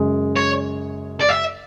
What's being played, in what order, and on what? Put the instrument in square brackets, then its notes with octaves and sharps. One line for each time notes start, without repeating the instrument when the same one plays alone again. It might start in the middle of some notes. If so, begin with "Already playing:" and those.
Already playing: [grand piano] F#2 C#3 G#3
[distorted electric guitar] C#5
D5
E5